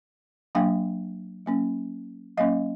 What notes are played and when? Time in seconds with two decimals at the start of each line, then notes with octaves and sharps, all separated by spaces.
0.55 F#3 A#3 D4 F5 G5
1.46 F#3 A#3 C#4
2.37 F#3 A#3 C#4 D#5 F5